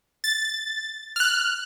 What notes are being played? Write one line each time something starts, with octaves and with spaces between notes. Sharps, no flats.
A6
F6 F#6